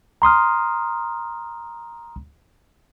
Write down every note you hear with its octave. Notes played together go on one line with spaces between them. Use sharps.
A#5 C6 D#6 F6